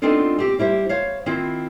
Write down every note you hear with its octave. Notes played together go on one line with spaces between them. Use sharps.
B3 C4 D4 D#4 F4 A4
C4 G4
G3 E4 G4 C5
C5 C#5 F5
D#3 C4 E4 F4